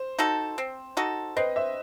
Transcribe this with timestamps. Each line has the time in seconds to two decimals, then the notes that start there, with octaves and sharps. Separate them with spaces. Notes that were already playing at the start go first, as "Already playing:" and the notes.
Already playing: C5
0.19 D#4 F#4 A4
0.58 C4
0.97 D#4 F#4 A4
1.36 C4 B4 D#5
1.56 C5 E5